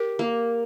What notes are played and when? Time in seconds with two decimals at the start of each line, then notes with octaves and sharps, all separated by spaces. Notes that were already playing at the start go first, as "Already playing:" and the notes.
Already playing: G4 A#4
0.19 A#3